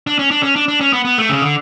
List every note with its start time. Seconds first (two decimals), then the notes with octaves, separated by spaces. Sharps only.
0.07 D4
0.19 C#4
0.31 D4
0.43 C#4
0.56 D4
0.68 D4
0.81 C#4
0.93 B3
1.05 B3
1.18 A3
1.29 C#3
1.42 D3